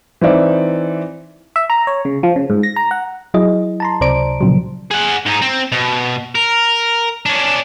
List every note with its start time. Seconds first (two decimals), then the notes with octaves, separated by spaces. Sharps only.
0.21 E3 C4 D#4 D5 E5
1.56 E5
1.70 A#5
1.87 C#5
2.05 C#3
2.23 F3
2.36 C#3
2.50 G#2
2.63 A#6
2.76 A#5
2.91 F#5
3.34 F#3 E4 G#4 D#5
3.80 A5 A#5 C6
4.01 C#2 C3 C5 D5 A#5 D7
4.41 A#2 C#3 F3 F#3
4.91 G#4 F#5
5.26 G#2 D#4
5.42 C4
5.72 B2
6.35 A#4
7.26 C#4 D4